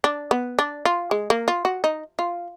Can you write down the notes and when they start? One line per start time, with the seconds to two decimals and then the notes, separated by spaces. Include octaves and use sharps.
0.04 D4
0.31 B3
0.59 D4
0.85 F4
1.11 G#3
1.30 A#3
1.48 F4
1.65 F#4
1.84 D#4
2.19 F4